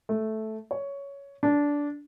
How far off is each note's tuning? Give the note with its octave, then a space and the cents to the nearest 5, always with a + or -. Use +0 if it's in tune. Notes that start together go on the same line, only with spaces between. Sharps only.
A3 -5
C#5 +10
D4 -15